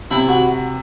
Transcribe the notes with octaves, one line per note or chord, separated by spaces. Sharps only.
C3 E4
F#4